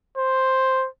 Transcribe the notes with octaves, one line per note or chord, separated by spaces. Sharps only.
C5